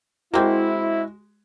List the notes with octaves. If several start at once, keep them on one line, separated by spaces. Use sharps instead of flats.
G#3 A#3 C4 E4 F#4